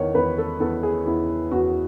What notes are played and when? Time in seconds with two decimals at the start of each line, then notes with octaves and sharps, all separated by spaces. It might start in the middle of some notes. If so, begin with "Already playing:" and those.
Already playing: E2 D#3 C#5
0.15 E2 B4
0.38 A4
0.60 E2 A4
0.83 G#4
1.06 E2 E4
1.51 E2 F#4